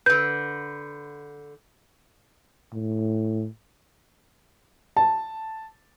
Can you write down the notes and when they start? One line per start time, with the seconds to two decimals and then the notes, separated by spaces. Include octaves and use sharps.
0.06 D3 B4 G6
2.73 A2
4.97 A5